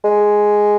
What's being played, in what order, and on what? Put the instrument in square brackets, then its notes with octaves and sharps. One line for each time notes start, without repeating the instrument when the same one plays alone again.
[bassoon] G#3